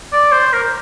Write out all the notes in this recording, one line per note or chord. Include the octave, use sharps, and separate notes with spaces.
D5
C5
A#4